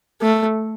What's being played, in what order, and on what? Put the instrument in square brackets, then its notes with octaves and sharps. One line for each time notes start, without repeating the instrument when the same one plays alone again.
[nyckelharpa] A3